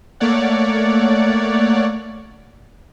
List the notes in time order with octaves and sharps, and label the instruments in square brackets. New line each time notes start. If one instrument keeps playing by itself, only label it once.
[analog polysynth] A3 A#3 C#5 D5 F#5